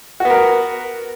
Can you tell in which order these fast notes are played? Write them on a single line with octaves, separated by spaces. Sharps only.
F#4 B3 A#4